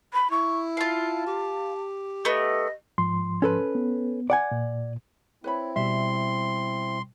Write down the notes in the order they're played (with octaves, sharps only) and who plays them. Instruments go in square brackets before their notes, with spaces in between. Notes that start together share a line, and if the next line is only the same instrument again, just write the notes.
[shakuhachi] B5
[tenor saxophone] E4 [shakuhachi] C#6
[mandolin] F4 F5 [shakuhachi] A5
[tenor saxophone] G4
[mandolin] A3 B3 [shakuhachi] D#5
[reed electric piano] G#2 F3 C6
[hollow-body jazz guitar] C#4 A4 B4
[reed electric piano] B3
[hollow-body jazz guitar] D5 F#5 G#5
[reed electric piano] A#2
[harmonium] C4 E4 [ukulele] B4 C#5 B5
[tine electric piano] B2 G3 [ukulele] E5 [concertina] C6